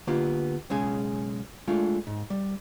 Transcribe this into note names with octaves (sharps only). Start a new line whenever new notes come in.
D3 A#3 B3 F4 G4
B1 C#3 G#3 G#4
G#3 A3 D4 F4
G#2
G3